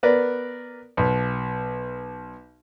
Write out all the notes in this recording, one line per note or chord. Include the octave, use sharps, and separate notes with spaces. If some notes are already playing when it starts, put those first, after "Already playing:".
B3 A#4 B4 D5
B1